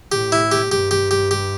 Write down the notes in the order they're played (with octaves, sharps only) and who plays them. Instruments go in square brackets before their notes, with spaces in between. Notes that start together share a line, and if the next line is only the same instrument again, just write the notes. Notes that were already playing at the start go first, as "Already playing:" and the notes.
[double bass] A2 [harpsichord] G4
[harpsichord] E4
G4
[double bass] G2 [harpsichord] G4
[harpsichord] G4
G4
G4